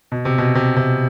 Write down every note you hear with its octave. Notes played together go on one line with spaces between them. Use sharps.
B2
C3
B2
C3
C3